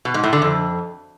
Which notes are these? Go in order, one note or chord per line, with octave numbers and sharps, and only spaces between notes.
B2
G#2
A2
D3
F2